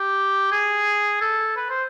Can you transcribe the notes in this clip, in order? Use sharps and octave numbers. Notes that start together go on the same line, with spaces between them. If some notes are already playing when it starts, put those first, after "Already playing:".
Already playing: G4
G#4
A4
B4
C5